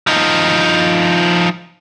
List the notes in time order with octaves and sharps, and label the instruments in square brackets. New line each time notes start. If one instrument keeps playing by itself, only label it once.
[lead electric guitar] F3 D#4